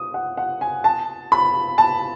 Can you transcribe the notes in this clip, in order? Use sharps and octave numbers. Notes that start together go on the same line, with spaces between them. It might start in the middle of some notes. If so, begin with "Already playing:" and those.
Already playing: D#6
F#5
F#5
G#5
A5
B5
A5